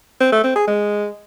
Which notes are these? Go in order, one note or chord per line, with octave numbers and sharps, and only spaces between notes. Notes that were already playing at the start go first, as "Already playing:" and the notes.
C4
A3
C4
G#4
G#3